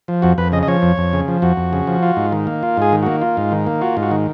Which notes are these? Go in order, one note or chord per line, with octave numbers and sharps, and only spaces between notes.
F3
F2 F#4
F2 B4
C#3 D#5
D#5
F3 C#5
F2
F2
C#3
F3
F2 F#4
F2
C#3
F3
F4
G#2
D#3
A#3
F4
G#2 G#4
D#3
A#3 F#4
F4
G#2
D#3
A#3
F4 F#4
G#2
F#4
D#3